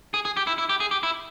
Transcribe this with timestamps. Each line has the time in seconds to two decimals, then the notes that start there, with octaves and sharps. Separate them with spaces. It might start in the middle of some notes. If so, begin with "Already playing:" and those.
0.14 G#4
0.25 G#4
0.37 G4
0.47 E4
0.58 E4
0.69 G4
0.80 G#4
0.91 G4
1.03 E4